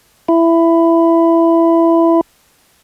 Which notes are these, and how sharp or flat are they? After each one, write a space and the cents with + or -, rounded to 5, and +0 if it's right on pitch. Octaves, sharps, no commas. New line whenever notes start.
E4 +15